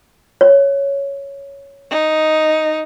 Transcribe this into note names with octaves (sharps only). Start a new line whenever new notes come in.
C#5
D#4